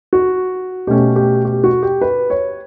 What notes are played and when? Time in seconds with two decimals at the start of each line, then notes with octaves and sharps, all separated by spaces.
0.13 F#4
0.87 B2 A3 C#4 G4
1.16 G4
1.45 G4
1.64 F#4
1.83 G4
2.01 B4
2.30 C#5